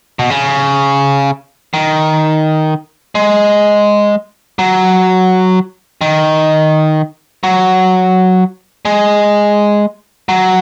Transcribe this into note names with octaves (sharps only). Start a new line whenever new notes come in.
B2
C#3
D#3
G#3
F#3
D#3
F#3
G#3
F#3